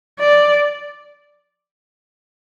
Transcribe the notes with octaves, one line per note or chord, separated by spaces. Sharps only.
D5